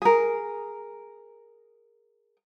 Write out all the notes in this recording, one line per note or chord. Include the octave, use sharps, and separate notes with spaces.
G#4 A#4